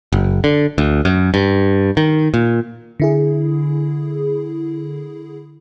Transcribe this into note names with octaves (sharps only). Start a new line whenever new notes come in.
F#1
D3
D2
F#2
G2
D#3
A#2
D3 E4 G#4